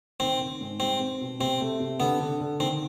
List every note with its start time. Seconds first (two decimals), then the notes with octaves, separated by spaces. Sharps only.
0.20 D#3 C4
0.40 D#3
0.61 G#2
0.80 G3 C4
1.00 C4
1.21 B2
1.40 C3 C4
1.61 A3
1.80 C3
2.00 D3 B3
2.20 D3
2.41 D3
2.60 D#3 C4